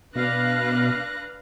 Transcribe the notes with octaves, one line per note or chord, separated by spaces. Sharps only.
B2 D4 B4 F5 F#6 A#6